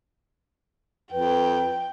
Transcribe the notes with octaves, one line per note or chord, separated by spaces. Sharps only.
F2 B4 G5